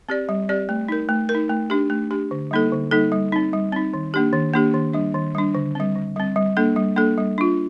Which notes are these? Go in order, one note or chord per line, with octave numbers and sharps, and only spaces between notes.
C4 G4 D5
G3
C4 G4 D5
A3
D#4 A#4
A3
A#4
D#4
A3
D4 G4
A3
D4 G4
D3
G3 A#3 D#4 A4
D3
G3 A#3 D#4 A4
G3
C4 D#4
G3
C4 D#4
D#3
A#3 D4 G4
D#3
A#3 D4 G4
D#3
G3 D4
D#3
G3 D4
D3
G3 C4
D3
G3 C4
G3
A#3 D4 A4
G3
A#3 D4 A4
G3
D4 F4